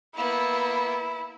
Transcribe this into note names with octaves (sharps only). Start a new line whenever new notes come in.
A#3 B3 E4